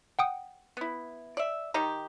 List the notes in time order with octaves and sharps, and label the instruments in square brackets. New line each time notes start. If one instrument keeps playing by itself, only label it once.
[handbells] F#5 G5 D#6
[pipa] B3 E4
D5 E5
D#3 D#4 G4